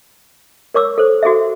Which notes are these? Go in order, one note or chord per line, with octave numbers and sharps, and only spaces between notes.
A#4 C#5 D6 E6
A4 C5
F#4 G#4 A4 E5